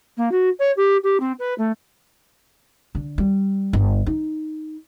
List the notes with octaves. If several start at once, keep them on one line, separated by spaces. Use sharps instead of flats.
A#3
F#4
C#5
G4
G4
C4
B4
A3
D3
G3
G1
D#4